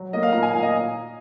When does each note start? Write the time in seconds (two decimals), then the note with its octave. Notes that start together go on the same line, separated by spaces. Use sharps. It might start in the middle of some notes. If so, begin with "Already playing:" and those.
Already playing: F#3
0.13 A#3 D#5
0.23 F5
0.33 A#2 A#5
0.43 G#5
0.54 A#2 F5
0.62 D#5